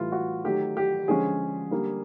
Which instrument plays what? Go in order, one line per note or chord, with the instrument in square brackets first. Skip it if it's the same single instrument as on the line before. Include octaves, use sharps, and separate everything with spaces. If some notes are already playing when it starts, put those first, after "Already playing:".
Already playing: [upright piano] A2 E3 G3 F4
F#4
D#3 F#3 A3 G4
G4
D3 F3 G#3 C#4 G#4
D3 G3 A#3